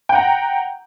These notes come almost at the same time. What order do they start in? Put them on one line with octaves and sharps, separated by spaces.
G5 F#5 A#5